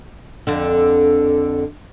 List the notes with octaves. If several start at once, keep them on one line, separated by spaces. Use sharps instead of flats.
F2 D3